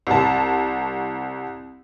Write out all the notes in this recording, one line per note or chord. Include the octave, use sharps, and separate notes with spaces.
C2 A5